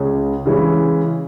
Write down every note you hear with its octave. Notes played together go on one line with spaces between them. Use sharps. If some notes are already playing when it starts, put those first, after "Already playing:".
Already playing: C#2 C#3 G#3 C#4
C#3 E3 G#3 C#4 E4